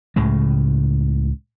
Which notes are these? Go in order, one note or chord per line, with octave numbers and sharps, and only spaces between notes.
C#2 A2 C#3 G#3